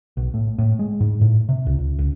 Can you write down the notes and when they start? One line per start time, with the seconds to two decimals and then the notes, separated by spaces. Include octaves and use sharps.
0.17 B1
0.34 A2
0.58 A2
0.79 G#3
1.00 G#2
1.21 A2
1.49 C3
1.66 C#2
1.79 C#2
1.99 C#2